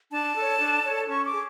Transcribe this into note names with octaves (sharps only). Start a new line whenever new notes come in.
D4 A5
A4 C#5
D4
A4 C#5
C#4 C#6
D6
G#4